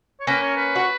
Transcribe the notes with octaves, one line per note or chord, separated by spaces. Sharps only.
C#5
A#3 C#4 B4
C#5
B4
F#4